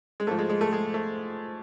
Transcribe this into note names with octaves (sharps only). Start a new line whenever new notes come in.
G#3
G#2 F3 A3
G#3
G#3
A3
G#3
A3